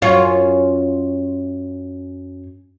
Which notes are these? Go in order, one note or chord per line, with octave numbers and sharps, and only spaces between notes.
F#2 C#4 F4